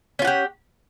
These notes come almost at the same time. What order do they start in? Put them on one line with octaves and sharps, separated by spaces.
C#4 F4 F#5 G4